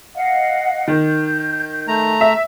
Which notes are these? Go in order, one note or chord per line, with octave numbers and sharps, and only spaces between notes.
D#5 F5 F#5
D#3 G6
A3 A#5
E5